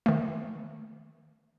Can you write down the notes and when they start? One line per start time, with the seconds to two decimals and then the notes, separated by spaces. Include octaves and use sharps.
0.06 D#3 A3